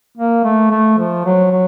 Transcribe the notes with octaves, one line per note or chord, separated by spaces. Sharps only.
A#3
A3
A3
F3
F#3
F#3